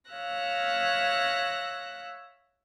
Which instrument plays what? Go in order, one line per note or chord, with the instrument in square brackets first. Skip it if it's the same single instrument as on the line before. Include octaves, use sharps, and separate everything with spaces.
[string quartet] C#5 E5 F5 E6 F#6 A#6